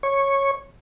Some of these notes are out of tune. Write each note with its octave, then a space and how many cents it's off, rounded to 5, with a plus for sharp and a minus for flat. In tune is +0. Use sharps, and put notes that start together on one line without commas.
C#5 -10